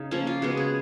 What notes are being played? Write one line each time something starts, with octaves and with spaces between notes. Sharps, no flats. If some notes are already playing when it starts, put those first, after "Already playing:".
Already playing: C#3 D#4
F3 A#3 C#4
F4
C#3 G#3 B3 F#4
G#4